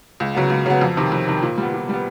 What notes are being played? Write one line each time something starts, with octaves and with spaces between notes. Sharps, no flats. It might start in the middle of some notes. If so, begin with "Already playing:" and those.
C#2
C#3 F#3 B3
C#2
C#3 F#3 B3
F2
C3 D#3
F2
C3 D#3
A#2
G3 B3
A#2
G3 B3